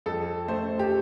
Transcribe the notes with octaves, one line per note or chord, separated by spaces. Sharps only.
F2 A4
A3 C5
G4